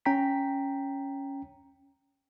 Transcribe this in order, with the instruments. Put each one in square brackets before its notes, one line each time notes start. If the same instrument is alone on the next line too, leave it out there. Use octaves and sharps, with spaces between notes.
[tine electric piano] C#4 G5 A#5 B6